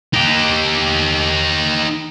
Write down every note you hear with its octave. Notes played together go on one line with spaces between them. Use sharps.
D#4 G4